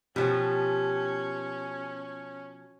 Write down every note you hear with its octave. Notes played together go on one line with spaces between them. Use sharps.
B2 F3 C#4 G4 B4